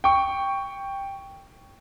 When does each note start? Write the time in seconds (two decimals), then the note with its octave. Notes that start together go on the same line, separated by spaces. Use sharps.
0.04 G5 C#6